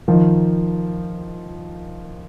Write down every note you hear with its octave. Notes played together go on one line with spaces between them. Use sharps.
D#3 F3